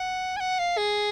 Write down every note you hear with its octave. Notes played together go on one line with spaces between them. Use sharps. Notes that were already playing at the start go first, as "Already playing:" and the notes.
Already playing: F#5
G#5
F#5
F5
G#4